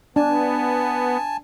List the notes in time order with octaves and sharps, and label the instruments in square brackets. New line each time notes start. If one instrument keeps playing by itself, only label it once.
[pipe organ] B3 [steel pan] D4 [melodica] G#5 A5